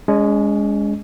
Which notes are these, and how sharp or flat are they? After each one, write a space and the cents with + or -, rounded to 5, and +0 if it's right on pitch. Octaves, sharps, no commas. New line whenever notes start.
G#3 -10 C#4 +40